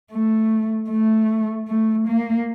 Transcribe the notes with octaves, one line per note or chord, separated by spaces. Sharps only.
A3
A3
A3
A#3